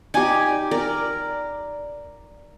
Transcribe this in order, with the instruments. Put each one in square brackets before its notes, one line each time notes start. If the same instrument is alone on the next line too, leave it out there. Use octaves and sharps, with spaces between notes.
[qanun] D#4 G4 [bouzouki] D5 G#5
[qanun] A#4 [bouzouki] D5